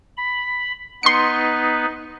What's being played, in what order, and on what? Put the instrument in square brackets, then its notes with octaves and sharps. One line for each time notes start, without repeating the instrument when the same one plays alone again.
[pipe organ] B5
[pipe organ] B3 D#4 B4 [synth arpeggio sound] C6 C#7